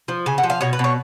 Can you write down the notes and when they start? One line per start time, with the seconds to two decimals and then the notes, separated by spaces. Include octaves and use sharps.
0.08 F3
0.26 C#3 G#5
0.38 F#5
0.43 F3
0.50 F5
0.61 B2 C#5
0.73 B4
0.79 B2 C#5